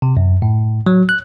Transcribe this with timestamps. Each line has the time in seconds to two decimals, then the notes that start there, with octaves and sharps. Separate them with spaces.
0.02 C3
0.17 F#2
0.42 A2
0.86 F#3
1.09 F#6